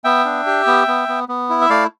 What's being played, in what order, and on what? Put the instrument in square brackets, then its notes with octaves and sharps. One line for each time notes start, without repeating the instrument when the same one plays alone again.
[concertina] B3 E5 G5
D4
G4
B3
B3
B3
B3
E4
E5
A3 D5 F5